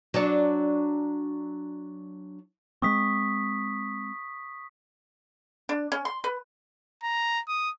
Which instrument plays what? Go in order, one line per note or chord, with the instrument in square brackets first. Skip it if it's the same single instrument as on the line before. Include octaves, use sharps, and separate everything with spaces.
[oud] F#3 D4 C#5
[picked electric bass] G#3 A3 C4 [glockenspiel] C#6 D#6 B6
[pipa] D4
C#4
C6
B4
[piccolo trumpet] A#5
D#6